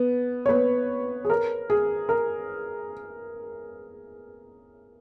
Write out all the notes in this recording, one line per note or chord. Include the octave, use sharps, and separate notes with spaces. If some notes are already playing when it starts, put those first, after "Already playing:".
Already playing: B3
C#5
B3 B4
G#4
A#4
G#4
A#4